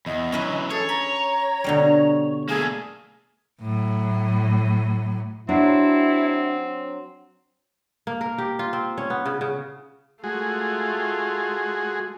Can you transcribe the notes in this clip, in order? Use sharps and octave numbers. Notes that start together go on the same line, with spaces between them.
E2 D#5
E3 F#3 C#4 B4 E5
G#4 A4 C#5
A#5 B5
B2 D3 G3
A3 A#3 G#4
A2 F#3
F#3 C4 D4 E4
A#3
A#4
G4
F4
C4
C#4
B3
C#3
C#3
G#3 A3 F4 F#4 G#4